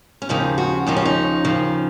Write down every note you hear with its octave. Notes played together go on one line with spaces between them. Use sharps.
C#4
D#2 C#3 F3 D#4
F#4
D#2 C#3 F3 D#4
C#4
D#4
D#2 C#3 F3